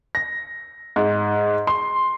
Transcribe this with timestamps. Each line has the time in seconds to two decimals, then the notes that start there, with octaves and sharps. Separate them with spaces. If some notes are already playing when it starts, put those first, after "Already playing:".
0.15 A#6
0.96 G#2
1.67 C6